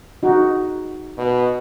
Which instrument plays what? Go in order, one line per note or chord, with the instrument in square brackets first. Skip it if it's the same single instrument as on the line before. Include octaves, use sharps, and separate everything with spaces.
[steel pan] D#4 F#4
[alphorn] B2